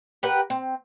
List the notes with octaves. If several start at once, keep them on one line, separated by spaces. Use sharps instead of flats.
G4 A#4 B4 F#5
C4